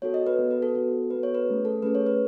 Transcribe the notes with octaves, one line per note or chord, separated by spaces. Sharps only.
B3 F#4 A4 C#5
D#5
B4
B3 F#4 A4
B4
A4
B3 F#4 A4
B3 F#4 A4 B4
C#5
B4
A3 C#4 G#4
A4
A3 C#4 G#4 B4
C#5
B4